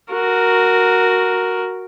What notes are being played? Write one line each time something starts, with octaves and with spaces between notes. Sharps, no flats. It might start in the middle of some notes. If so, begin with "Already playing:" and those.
F#4 A#4